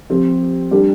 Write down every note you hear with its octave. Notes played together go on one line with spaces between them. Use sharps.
F3 C4 G4
G3 D4 G4